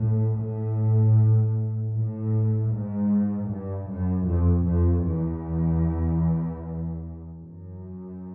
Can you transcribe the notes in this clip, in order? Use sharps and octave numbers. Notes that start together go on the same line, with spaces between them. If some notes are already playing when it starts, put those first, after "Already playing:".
Already playing: A2
A2
A2
G#2
G2
F#2
F2
F2
E2
F#2